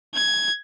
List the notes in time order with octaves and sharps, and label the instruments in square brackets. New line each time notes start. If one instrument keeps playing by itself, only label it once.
[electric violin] G#6